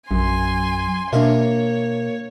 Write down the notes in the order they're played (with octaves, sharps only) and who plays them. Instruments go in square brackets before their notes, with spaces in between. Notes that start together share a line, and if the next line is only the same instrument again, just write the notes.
[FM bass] A#1 [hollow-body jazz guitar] F#2 [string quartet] G#5 C6
[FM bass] B2 [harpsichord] A#3 A#4 [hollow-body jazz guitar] D4 E5 [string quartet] C#5